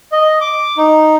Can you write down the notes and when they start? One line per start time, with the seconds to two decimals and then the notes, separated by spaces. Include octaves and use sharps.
0.12 D#5
0.41 D6
0.77 D#4